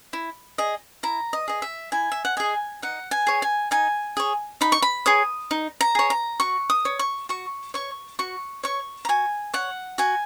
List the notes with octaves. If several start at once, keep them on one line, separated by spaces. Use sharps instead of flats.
E4
G#4 D#5
E4 A#5
D#5
G#4 D#5
E5
E4 G#5
E5
F#5
G#4 D#5 G#5
D#4 F#5
G#5
G#4 C#5
G#5
D#4 G#5
G#4 C#5
D#4 B5
C#6
B5
G#4 C#5 D#6
D#4
A#5
G#4 C#5
A#5
F#4 C#6
D#6
C#5
C#6
F#4 C#6
C#5 C#6
F#4 C#6
C#5 C#6
A#5
F#4 G#5
C#5 F#5
F#4 G#5